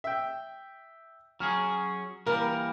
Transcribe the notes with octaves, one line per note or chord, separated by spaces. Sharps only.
E5 G5
F#3 C#4 G#4 F6
E3 G3 A#3 A#4